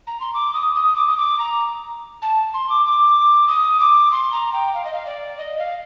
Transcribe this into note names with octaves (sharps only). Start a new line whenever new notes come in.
A#5
C6
D6
D#6
D#6
D6
D#6
D6
A#5
A5
C6
D6
D6
D#6
D6
C6
A#5
G5
F5
D#5
F5
D5
D#5
F5